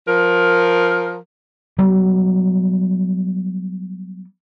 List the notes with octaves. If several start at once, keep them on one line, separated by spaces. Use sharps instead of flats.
F3 A#4
F#3 G3 B3